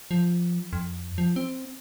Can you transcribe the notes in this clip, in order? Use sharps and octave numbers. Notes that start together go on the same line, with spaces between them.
F3
F2
F3
C4